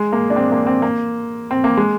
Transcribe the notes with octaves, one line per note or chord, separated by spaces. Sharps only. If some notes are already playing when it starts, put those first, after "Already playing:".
Already playing: G#3
A#3
D4
C4
A#3
C4
A#3
C4
A#3
G#3